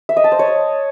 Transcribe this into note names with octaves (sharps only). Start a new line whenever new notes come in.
E5
D#5
A5
C5
C#5